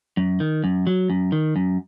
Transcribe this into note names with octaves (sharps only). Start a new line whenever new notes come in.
F#2
D#3
F#2
F#3
F#2
D#3
F#2